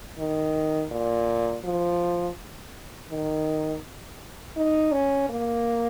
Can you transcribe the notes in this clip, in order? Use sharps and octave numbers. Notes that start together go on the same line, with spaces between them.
D#3
A#2
F3
D#3
D#4
C#4
A#3